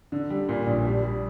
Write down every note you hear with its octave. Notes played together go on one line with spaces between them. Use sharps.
D3
G3
A#2
A#1
G3
G3